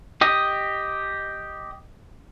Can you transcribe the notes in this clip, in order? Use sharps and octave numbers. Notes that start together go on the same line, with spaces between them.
G4 D#5